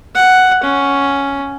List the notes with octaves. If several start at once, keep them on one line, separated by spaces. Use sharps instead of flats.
F#5
C#4